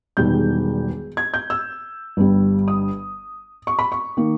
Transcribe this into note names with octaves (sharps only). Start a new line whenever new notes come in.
E1 E2 D#3 G3 G6
G#6
G6
E6
G1 G2 G3
D#6
C#6
B5
C#6
D#3 A#3